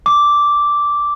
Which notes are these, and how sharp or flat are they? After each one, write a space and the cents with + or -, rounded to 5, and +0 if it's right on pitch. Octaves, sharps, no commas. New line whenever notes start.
D6 -5